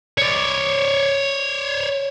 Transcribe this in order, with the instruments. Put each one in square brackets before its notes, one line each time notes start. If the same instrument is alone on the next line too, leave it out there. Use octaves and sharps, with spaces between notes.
[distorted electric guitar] C#5 D5